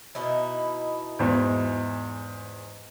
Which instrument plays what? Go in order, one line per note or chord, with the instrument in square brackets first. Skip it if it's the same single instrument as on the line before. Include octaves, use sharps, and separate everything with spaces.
[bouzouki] B2 D#4 E4
[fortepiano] E2 G#2